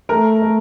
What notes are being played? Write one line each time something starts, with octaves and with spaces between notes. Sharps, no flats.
A3 A#4
A3